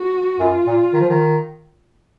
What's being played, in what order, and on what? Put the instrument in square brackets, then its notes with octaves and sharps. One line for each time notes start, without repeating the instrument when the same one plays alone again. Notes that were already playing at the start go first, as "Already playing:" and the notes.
Already playing: [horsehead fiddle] F#4
[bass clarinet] F#2 [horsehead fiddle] F4
[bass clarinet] A#2
D#3
F3
D#3